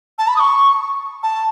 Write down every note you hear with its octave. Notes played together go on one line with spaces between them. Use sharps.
A5
B5
D#6
C#6
A5